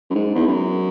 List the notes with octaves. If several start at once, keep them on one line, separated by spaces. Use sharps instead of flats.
F#2
G#2
E2
F#2